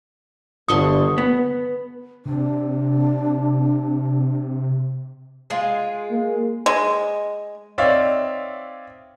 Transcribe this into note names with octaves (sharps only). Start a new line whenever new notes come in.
G1 D3 C6 C#6 D#6
B3
C3 D4
G#3 F4 G#4
A#3
G#3
C4 D#4 C#5 D5 E5 F5